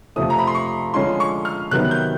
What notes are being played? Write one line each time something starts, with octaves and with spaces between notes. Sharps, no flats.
F2 C3 F3 A3 D#6
A#5
B5
C6
C#6
D3 F3 G#3 C#4 C6
C#6
F6
C3 D#3 F#3 B3 F#6
G6